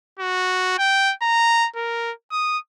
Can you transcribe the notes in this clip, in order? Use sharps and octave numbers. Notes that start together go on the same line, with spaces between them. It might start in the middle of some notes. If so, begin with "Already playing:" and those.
F#4
G5
A#5
A#4
D#6